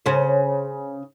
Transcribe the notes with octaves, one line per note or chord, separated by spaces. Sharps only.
C#3 C5